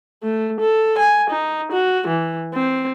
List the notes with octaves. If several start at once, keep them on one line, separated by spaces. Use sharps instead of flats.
A3
A4
G#5
D#4
F#4
E3
C4